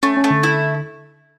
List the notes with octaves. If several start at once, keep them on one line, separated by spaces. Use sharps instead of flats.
A3 C#4
C#4
A3
D3
E4